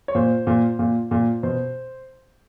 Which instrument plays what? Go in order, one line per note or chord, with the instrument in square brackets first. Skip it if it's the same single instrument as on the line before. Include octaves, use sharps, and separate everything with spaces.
[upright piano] C#5
A#2 C5
A#2
A#2
A#2
B2 C5